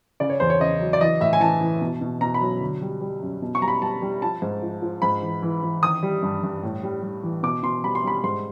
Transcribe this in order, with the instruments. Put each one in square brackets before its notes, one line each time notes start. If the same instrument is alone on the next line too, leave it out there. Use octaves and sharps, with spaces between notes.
[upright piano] C#3 D5
C#5
E2 C5
C#5
C#3 D#5
F#3
D5
E3 D#5
A2 E5
G#5
E3 A5
E3
B2
B2
B2 A#5
B5
F#3
D3
G3
G3
F#2
B2
C#6
G3 A#5
B5
G3 A5
G3
F3 A5
G#2
F3
F3
G#2 B5
E3
E3
E3
D#3 D#6
G3
G2
G2
A2
G3
G3
E3
B2 D6
B2 C6
G3 B5
C6
G3 B5
G#2 C6